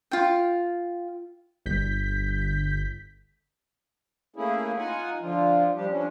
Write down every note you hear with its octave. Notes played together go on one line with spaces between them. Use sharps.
F4 G5
G1 G6 B6
A3 A#3 C#4 E4 G#4
D#4 F4 F#5 G#5
D3 F3 F4
F3 G3 D4 G4
F3 C#4 D4